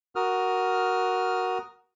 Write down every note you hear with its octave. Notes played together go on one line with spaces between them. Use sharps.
F#4 A#4 D#6 F6